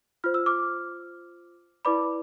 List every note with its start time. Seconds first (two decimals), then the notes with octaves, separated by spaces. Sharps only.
0.24 F4 C5 F6
0.34 E6
0.46 D6 F6
1.85 E4 B4 D5 B5 D6